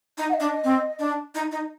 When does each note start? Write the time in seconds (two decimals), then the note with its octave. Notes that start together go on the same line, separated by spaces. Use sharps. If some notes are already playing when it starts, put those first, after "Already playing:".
0.18 D#4
0.30 F#5
0.34 D#5
0.40 D4
0.64 C4
0.99 D4
1.35 D#4
1.52 D#4